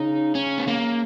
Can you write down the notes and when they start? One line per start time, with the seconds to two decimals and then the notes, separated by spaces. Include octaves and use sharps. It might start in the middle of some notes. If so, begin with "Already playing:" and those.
Already playing: C#3 D#4
0.35 C#4
0.58 B3
0.68 A#3